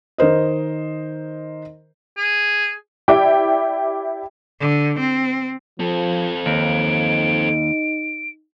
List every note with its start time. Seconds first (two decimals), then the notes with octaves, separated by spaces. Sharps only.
0.18 D#3 A#4 C5 D#5
2.17 G#4
3.08 E4 G4 D5 G5
4.60 D3
4.99 C4
5.80 F3 C4 A4
6.46 D#2 D#4 D7